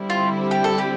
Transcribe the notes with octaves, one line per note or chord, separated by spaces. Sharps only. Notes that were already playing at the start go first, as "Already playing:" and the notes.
Already playing: D3 G3 C4 E4
F4
G4
A4
G4